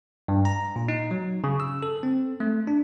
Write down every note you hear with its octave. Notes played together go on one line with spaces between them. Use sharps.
G2
A#5
A#2
D#4
F#3
C#3
E6
A4
C4
A3
D4